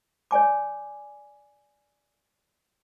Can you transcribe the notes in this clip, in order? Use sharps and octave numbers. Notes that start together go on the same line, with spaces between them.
C#5 D5 G#5 D6